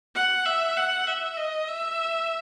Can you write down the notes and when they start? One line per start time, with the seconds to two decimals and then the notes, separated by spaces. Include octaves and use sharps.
0.15 F#5
0.46 E5
0.77 F#5
1.07 E5
1.37 D#5
1.68 E5